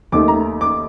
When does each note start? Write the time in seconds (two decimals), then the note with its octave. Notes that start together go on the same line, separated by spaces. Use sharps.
0.12 D#2 D#3 A3 D6
0.28 A#5
0.61 D6